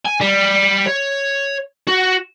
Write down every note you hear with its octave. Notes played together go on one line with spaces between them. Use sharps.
G#5
G3
C#5
F#4